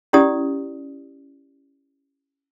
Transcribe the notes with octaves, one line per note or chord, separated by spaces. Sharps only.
C#4 E4 G4 D5 D#6